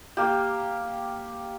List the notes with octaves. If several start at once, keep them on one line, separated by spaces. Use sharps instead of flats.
A#3 G4